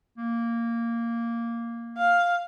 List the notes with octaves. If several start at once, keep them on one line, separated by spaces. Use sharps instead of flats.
A#3
F5